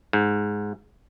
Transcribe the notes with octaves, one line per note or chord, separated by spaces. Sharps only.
G#2